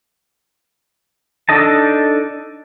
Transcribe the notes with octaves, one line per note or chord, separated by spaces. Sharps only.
D4 D#4 A4 D#5 A5